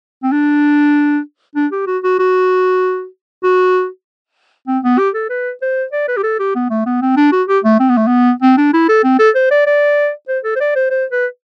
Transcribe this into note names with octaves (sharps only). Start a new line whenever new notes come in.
C4
D4
D4
G4
F#4
F#4
F#4
F#4
C4
B3
G4
A4
B4
C5
D5
B4
G4
A4
G4
B3
A3
B3
C4
D4
F#4
G4
A3
C4
B3
A3
B3
C4
D4
E4
A4
C4
A4
C5
D5
D5
C5
A4
C5
D5
C5
C5
B4